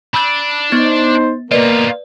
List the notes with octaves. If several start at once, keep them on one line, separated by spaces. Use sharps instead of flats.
D4 B5 E6 G6
B3 D#4 C5 A6
B2 A#3 F4 B4 D5 D#5